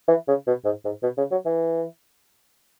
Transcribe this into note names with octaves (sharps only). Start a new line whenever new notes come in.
E3
C#3
B2
G#2
G#2
B2
C#3
F#3
E3